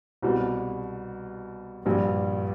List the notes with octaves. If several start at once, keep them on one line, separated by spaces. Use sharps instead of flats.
C2 B2 G3
A#1 G2 A#2 G3